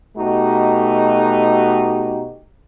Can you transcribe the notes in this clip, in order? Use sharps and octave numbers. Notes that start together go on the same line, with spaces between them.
B2 A3 D#4 F#4 G4